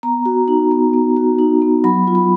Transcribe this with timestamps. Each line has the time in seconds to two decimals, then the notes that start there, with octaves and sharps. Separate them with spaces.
0.03 B3 A#5
0.25 F#4
0.48 D#4
0.71 B3
0.93 B3
1.16 F#4
1.38 D#4
1.62 B3
1.84 F#3 B5
2.07 F4
2.15 B5